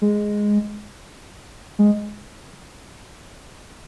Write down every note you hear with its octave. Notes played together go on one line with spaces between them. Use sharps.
G#3
G#3